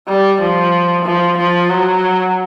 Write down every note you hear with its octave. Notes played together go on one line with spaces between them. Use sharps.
G3
F3
F3
F3
F#3